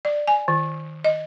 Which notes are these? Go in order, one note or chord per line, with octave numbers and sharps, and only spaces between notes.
D5
G#5
D#3
D#5